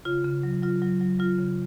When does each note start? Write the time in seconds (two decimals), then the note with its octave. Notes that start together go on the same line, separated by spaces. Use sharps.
0.05 C#3 F4
0.25 C#3
0.43 F#3
0.62 F#3 F4
0.82 F#3
1.01 F#3
1.19 F#3 F4
1.39 C#3